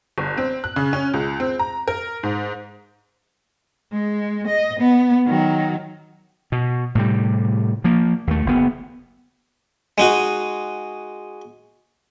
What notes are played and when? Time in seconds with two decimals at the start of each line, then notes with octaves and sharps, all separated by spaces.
0.18 G1
0.37 C4
0.64 F#6
0.76 C#3
0.93 C#4
1.13 C#2
1.40 C4
1.59 A#5
1.88 A#4
2.23 G#2
3.93 G#3
4.48 D#5
4.80 B3
5.26 D#3 F#3
6.52 B2
6.95 A2 C3 G3
7.84 F3 A#3
8.27 D#2 A3
8.46 F#1 B3
9.98 G#3 D#4 F#4